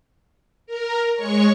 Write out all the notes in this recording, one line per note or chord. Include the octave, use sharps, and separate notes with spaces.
A#4
G#3 C#5 C#6